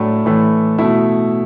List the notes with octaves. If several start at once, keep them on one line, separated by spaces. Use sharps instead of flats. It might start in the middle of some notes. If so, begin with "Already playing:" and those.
Already playing: A2 F#3 A3 D4
A2 E3 A3
B2 A3 E4